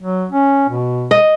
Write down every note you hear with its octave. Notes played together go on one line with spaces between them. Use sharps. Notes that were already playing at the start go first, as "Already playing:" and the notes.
F#3
C#4
B2
D#5